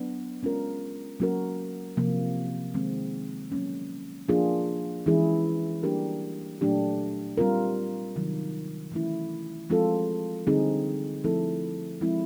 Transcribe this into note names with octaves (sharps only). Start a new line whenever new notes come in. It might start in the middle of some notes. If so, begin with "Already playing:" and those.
Already playing: F#3 B3 D4
G#3 C#4 F4 A#4
F#3 A#3 C#4 F#4 A#4
C3 F3 A#3
D#3 G#3 C4
F#3 A#3 C#4
F3 A#3 D4 F4 G#4
E3 G#3 C#4 E4 G#4
G3 A#3 D4 G4 A#4
A#2 F#3 A3 D4 G4
G3 C4 F4 A#4
C3 D#3 F#3
E3 A3 C#4 E4
F3 G#3 C4 F4 A4
D3 G3 C4 D#4 G#4
F3 A3 C4 E4 A4
F3 G#3 C4 E4